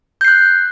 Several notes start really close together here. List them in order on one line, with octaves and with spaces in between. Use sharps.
G6 C7 F#6